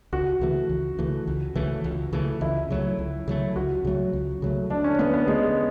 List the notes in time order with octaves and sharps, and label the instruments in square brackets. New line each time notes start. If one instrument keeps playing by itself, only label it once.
[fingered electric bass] C#2 [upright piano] F#4
[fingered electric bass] C#3 E3 A3
C#2
C#3 E3 A3
C#2
C#3 E3 A3
C#2
C#3 E3 A3
[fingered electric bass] C#2 [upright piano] E4
[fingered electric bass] C#3 F#3 A3
C#2
C#3 F#3 A3
[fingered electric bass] C#2 [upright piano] F#4
[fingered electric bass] C#3 F#3 A3
C#2
C#3 F#3 A3
[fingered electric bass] D2 [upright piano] D4
[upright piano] C#4
[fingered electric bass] D3 A3 C#4 [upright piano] B3
[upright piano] B3
[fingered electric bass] D2 [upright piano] G#3